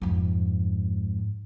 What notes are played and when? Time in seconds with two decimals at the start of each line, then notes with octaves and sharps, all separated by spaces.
0.02 F2 G#2